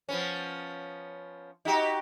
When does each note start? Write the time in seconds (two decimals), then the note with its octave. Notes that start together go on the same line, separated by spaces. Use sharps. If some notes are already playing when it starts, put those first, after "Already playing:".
0.09 F3 B3 C#4
1.65 D#4 F#4 G4